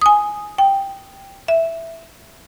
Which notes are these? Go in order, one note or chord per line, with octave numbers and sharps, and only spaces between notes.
G#5 D#6
G5
E5